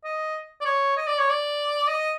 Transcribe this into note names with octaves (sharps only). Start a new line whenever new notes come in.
D#5
D5
C#5
D#5
D5
C#5
D5
D#5